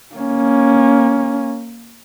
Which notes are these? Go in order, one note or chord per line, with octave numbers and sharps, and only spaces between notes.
A#3 C#4